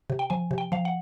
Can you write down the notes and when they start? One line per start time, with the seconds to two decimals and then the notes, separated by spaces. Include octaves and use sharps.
0.10 C3
0.19 G5
0.30 F3 G#5
0.51 C3
0.58 G5
0.72 F3 F5
0.85 F#5